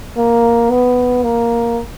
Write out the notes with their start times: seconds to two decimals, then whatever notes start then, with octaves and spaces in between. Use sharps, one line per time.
0.17 A#3
0.70 B3
1.23 A#3